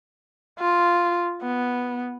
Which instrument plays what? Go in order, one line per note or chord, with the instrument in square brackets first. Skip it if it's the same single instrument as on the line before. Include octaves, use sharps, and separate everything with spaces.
[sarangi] F4
B3